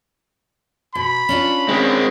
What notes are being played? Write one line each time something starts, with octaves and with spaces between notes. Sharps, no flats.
B2 B5
C#4 D4 F4
G#3 C4